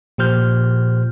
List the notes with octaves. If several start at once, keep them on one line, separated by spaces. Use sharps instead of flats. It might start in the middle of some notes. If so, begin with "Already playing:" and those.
A#2 F3 G4 C5 F6 G6